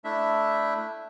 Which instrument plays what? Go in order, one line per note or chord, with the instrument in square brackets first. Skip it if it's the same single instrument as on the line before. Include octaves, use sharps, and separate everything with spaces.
[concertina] A3 D4 E4 E5